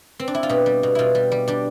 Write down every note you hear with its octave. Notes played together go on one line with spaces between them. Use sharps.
C4
D4
E4
F4
B2 G4
G3
B2
B2 E4 F4
G3
G3
G3 D4